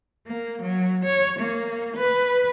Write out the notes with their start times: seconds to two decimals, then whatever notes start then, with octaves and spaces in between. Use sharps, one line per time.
0.27 A#3
0.62 F#3
1.05 C#5
1.39 A#3
1.97 B4